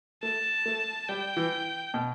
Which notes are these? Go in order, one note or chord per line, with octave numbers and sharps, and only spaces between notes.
A3 A5
A3
G3 G5
E3
B2